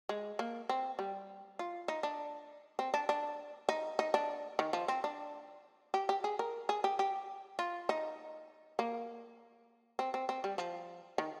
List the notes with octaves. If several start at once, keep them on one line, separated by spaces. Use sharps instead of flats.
G#3
A#3
C4
G3
F4
D#4
D4
C4
D4
D4
D#4
D#4
D4
D#3
F3
C4
D4
G4
G4
G#4
A#4
G#4
G4
G4
F4
D#4
A#3
C4
C4
C4
G3
F3
D#3